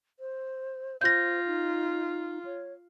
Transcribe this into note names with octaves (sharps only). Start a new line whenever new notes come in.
C5
F4 C5 G6 A#6
D#4
C#5